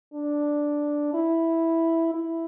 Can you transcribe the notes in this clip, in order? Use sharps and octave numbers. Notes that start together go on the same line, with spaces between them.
D4
E4
E4